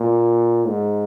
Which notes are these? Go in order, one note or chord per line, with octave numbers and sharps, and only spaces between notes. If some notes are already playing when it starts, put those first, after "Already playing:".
Already playing: A#2
G#2